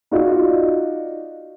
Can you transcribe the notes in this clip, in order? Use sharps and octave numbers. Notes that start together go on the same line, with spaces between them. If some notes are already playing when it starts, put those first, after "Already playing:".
D#4 F4 F#4 D5 D#5